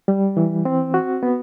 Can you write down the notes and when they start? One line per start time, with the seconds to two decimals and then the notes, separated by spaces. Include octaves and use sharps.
0.08 G3
0.37 E3
0.65 C4
0.94 F#4
1.23 B3